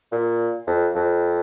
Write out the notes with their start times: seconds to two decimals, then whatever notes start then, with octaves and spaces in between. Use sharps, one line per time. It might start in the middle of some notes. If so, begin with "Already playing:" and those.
0.12 A#2
0.67 F2
0.95 F2